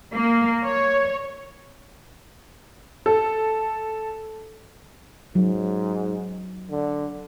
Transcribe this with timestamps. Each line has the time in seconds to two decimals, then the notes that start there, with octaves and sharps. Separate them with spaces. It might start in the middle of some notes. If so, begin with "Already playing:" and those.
0.13 A#3
0.63 C#5
3.06 A4
5.35 G#2 F#3
6.70 D3